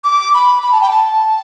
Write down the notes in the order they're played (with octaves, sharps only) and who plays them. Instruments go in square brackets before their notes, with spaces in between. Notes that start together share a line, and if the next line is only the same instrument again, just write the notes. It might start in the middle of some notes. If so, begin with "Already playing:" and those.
[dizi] D6
B5
B5
A5
G5
A5